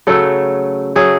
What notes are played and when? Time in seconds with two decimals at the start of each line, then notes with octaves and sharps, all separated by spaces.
0.07 C#3 F#3 A3 A4
0.96 F#3 A3 G#4